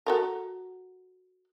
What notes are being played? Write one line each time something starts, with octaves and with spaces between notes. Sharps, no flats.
F#4 A4 A#4